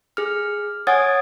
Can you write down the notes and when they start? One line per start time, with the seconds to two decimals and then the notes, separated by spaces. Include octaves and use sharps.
0.17 G#4 F6
0.87 C#5 F#5 G#5 D#6 G#6 A6